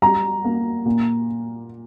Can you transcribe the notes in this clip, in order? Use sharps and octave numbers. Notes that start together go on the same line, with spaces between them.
G3 A#5
A#3
A#2